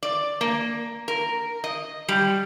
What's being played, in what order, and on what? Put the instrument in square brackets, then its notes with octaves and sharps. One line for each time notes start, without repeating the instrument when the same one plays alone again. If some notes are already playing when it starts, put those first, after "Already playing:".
[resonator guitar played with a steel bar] D5
A#3
A#4
D#5
G3